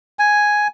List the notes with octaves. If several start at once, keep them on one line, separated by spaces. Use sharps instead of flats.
G#5